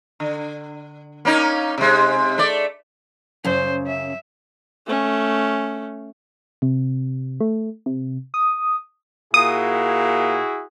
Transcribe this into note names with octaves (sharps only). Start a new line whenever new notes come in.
D3
A#3 C#4 D#4
C3 G#3
A3 D5
F#2 C#3 C5
E5
A3 C#4
C3
A3
C3
D#6
A#2 E4 F#4 G#4 D#6